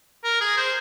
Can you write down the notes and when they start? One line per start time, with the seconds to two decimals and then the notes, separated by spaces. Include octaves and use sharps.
0.24 A#4
0.41 G#4
0.57 C5